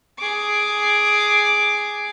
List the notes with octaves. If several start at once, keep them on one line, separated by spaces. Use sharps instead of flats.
G#4 D6